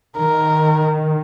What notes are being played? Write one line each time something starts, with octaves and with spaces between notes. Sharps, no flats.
D#3 A#4